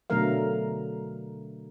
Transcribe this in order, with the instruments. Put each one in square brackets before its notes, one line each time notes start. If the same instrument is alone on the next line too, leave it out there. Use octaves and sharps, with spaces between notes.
[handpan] B2 D3 F#3 A3 A#4 F5